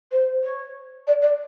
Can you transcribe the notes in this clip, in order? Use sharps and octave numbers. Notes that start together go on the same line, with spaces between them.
C5
C#5
D5
D5